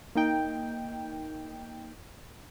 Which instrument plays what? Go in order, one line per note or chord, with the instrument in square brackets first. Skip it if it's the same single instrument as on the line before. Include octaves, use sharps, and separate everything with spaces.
[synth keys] A#3 D#4 G5